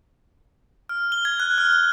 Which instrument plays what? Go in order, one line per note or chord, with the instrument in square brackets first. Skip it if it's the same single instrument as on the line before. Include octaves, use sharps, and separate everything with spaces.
[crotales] F6
G7
G#6
F#6
F6
F#6